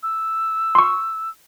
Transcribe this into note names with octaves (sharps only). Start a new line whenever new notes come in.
E6
C6 C#6